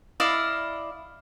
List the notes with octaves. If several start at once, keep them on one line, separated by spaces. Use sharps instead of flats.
E4 D5 D#5 F5